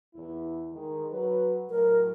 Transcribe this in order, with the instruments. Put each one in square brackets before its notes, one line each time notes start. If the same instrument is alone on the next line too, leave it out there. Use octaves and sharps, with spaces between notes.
[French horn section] E2 E4
D#3 G#3
F#3 B4
[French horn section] A2 F#3 [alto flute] A#4